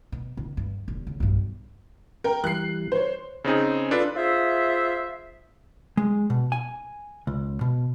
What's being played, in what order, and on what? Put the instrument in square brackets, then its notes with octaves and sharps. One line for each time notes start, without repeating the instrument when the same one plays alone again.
[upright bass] B2
C#2
G2
E1
C#3
B1 G2
[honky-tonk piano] A#4 G5
[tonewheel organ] E3 G3 [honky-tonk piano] F#6 C7
[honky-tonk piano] C5 C#5
[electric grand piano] C#3 C4 D#4 G#4
D4 F4 A4 B4
[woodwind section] F4 G#4 C5 E5
[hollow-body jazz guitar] G#3
B2
G#5
C#2
B2